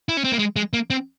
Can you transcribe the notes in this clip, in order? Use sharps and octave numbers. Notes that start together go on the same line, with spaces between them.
E4
C#4
C4
A#3
G#3
G#3
A#3
C4